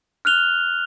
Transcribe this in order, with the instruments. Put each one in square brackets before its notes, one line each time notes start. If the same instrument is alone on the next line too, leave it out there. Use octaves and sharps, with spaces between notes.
[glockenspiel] F6 F#6 F7 G7